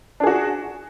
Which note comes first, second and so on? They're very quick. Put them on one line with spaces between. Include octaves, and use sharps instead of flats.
D4 G#4 F#4